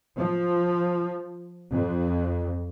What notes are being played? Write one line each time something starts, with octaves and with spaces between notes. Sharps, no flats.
F3
F2